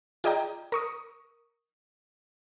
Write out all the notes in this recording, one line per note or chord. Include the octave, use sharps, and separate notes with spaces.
F4 G#4 D5 D#5 G5 A#5
A#4 C#6 D#6